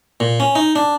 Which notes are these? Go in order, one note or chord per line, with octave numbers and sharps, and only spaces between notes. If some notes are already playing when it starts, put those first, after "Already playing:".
A#2
C#4
D#4
D4